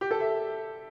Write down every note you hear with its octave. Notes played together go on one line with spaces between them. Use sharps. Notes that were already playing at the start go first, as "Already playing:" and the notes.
G4
A4
E5